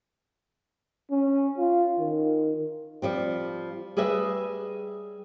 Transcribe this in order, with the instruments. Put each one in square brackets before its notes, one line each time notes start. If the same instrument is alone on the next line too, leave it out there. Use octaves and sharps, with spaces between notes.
[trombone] C#4
F4
D#3
[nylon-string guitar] F3 G3 C4
G3 G#4 B4 D#5 E5